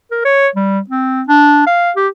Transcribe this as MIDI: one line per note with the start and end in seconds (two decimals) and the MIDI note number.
0.11 0.24 70
0.25 0.48 73
0.56 0.79 55
0.90 1.23 60
1.28 1.63 62
1.67 1.91 77
1.96 2.08 67